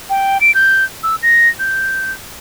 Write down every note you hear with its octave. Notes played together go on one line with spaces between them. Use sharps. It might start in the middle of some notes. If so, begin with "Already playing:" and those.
G5
D7
G6
E6
A#6
G6